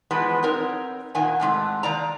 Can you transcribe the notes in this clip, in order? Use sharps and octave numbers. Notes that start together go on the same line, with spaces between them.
B2 E3 F3 G#3 B3
C4 D#4 A#4 C#5
A#2 D#3 F#5 G#5
A2 C3 G#3 A3
D#3 A#3 D5 A#5